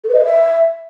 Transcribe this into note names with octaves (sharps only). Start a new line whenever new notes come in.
A4
B4
D#5
B4
E5